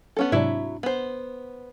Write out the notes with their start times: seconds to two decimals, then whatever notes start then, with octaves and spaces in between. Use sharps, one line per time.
0.17 B3 C#4 A4
0.32 G#2 C3 F#3 D4 E4 E5
0.83 B3 C5